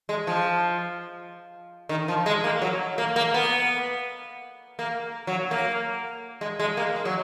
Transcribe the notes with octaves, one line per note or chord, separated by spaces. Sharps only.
G#3
F3
D#3
F3
G#3
A#3
F#3
A#3
A#3
B3
A#3
F#3
A#3
G#3
G#3
A#3
G#3
F#3